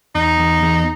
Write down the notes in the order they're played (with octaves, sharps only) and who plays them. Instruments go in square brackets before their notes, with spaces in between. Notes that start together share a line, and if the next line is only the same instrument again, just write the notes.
[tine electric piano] E2 [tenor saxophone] D#4
[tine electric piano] E2
E2